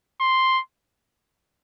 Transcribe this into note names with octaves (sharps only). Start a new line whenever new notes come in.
C6